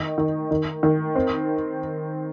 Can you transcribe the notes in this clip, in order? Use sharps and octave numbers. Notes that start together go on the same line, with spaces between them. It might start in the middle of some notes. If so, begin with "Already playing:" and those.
Already playing: D#3 D#4
D#3
D#3
D#3
C4